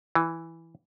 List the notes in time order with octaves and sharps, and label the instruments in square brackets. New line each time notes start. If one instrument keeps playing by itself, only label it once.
[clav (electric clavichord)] E3